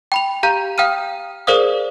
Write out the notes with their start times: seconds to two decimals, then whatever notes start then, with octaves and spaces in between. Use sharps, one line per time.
0.12 G5 B5 F7
0.43 G4 F5 A#5 G6
0.78 F5 G5 D#6 F6 D#7
1.47 G#4 A#4 C5 D5 F5 D#6